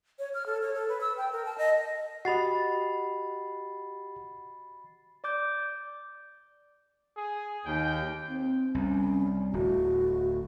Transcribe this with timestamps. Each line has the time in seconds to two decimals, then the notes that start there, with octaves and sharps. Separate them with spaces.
0.19 C#5
0.34 F6
0.46 A4
0.62 C#5
0.74 A4
0.88 B4
1.01 E6
1.17 G5
1.32 A#4
1.45 A5
1.58 D#5
2.25 F#4 G4 D#5 F#5 B5 A6 C7
5.24 D5 D6 G6
7.17 G#4
7.66 D#2 G5
8.29 C4
8.75 C2 C#4
9.53 D1 F#4